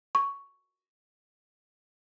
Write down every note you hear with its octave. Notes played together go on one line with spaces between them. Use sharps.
C#6